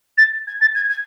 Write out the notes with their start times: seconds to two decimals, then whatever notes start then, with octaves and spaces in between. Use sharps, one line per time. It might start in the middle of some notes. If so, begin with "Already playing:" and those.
0.17 A6
0.47 G#6
0.61 A6
0.75 G#6
0.90 G#6